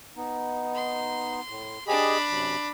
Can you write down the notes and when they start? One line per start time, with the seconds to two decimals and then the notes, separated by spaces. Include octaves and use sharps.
0.17 B3 D#4
0.75 C6
1.49 A2
1.87 D4 G4 G#4 D#5 B5
2.31 F#2 C3 F#3